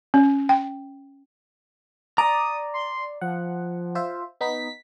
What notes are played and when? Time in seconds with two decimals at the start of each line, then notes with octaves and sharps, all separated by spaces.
0.14 C#4
0.49 G5
2.18 D5 A#5 D#6
2.74 C6
3.21 F3 F#5
3.95 F4 C5 E5
4.41 B3 D#4 B6